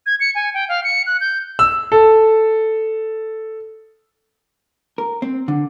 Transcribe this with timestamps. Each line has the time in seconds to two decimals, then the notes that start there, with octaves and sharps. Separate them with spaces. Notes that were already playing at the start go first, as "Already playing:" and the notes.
0.06 G#6
0.20 C#7
0.35 G#5
0.54 G5
0.69 F5
0.84 C#7
1.07 F#6
1.21 G6
1.59 E6
1.92 A4
4.98 A#4
5.22 C4
5.48 D3